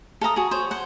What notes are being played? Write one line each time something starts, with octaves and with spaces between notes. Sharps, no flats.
A4 F5 A#5 D#6
F#4 G#4
C5 C#5
C5 F#5